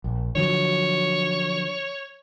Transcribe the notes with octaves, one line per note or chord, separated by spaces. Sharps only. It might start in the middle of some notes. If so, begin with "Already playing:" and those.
A#1
D3 F3 F#3 C#5